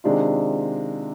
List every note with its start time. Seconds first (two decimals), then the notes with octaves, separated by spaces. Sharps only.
0.04 C3 D#3 G#3 D4 F4